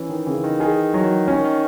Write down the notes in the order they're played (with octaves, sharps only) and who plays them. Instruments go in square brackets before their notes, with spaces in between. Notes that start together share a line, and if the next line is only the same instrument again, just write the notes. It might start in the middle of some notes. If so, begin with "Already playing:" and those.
Already playing: [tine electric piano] E3 [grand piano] C#4
[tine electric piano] D#3
[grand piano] C#3 [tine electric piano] E3
[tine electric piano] D#3
[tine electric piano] D#3 [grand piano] G#4
[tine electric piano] D#3 [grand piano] F#3
[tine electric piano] D#3 [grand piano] C#4
[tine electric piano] D#3